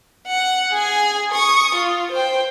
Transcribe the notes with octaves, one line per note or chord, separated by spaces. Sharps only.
F#5
G#4 G#5
C#6 D#6
F4
C5 G5